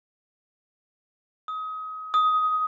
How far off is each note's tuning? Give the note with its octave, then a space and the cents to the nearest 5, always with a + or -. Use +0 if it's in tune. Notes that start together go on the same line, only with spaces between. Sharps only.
D#6 +30
D#6 +15